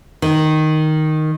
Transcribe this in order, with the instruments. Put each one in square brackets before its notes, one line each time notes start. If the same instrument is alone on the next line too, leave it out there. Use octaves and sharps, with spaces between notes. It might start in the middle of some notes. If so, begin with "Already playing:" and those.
[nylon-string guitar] D#3